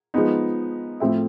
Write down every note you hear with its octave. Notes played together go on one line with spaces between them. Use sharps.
F3 G#3 B3 D#4
A2 F3 A3 C4 E4